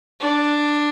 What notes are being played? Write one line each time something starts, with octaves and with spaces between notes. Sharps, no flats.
D4